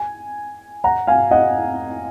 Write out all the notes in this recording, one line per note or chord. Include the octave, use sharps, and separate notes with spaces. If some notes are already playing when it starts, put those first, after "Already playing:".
Already playing: G#5
F#5 A#5
F5 G#5
D#5 F#5